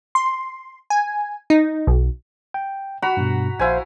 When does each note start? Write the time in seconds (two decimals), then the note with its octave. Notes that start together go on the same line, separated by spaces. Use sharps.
0.15 C6
0.90 G#5
1.50 D#4
1.87 B1
2.54 G5
3.02 F#4 A#5 B5
3.17 G2 B2
3.59 A#1 E4 C5 F5 G#5